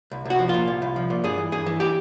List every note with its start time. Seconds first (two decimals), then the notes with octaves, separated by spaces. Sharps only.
0.11 C2
0.25 C2 F#4
0.39 F3
0.49 A#2 F4
0.68 C2
0.82 C2
0.96 F3
1.10 A#2
1.24 G2 G#4
1.38 E3
1.52 G2 G#4
1.67 E3
1.80 G4